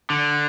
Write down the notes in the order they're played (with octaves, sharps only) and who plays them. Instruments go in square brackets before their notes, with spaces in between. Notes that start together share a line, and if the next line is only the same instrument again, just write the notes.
[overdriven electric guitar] D3